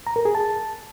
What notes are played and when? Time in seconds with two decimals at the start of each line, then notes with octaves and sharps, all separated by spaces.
0.07 A#5
0.16 A#4
0.25 G#4
0.35 A5